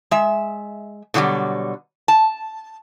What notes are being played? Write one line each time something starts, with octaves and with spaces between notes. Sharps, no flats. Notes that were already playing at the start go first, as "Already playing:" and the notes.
G#3 E5
B2 D3 E3 F#3 G3
A5